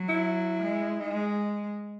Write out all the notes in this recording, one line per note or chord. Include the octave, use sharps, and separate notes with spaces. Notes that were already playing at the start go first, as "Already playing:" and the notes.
Already playing: F#3
E4
G#3
G#3 D#4